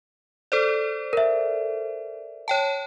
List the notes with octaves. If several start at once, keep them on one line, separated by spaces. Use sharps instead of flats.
A4 C5 D5
A#4 E5
C#5 G5 A5